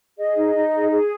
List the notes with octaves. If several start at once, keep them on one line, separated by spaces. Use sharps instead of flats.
G#4 D#5
D#4
D#4
G#4
G#4